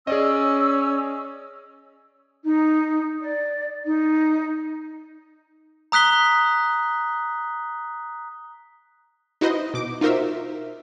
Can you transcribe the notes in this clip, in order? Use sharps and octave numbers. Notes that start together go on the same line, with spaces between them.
C#4 G#4 D5 D#5 E6
D#4
D5
D#4
A#5 D#6 F#6 B6 G7
D#4 E4 F#4 B4 C5 D#5
B2 D6
D#4 F4 F#4 A#4 C5 E5